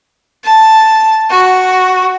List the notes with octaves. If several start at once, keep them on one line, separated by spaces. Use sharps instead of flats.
A5
F#4